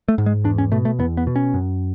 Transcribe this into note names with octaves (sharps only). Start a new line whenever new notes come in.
A3
G#2
G#3
E2 D4
C#4
B2 A3
A3
E2 B3
B3
B2
C#4
F#2